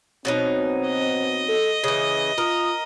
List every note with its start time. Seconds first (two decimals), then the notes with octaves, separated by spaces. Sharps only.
0.25 B2 F#3 C4 D#4
0.87 D#5
1.48 A4
1.84 C#3 E3 D#6
2.38 F4 A#4 D#6